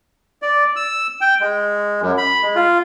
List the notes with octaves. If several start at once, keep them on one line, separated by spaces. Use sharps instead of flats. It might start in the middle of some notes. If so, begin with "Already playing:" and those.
D5
E6
G5
G#3
F#2
B5
G#3
F4